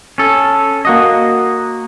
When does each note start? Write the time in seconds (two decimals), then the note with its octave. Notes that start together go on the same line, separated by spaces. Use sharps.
0.18 C#4 A4
0.85 A#3 F#4 D#5